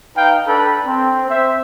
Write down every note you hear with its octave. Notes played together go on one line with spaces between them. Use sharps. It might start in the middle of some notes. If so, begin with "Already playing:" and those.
D#4 B4 F5 G5
D4 A4 B4 B5
C4
C4 C5 E5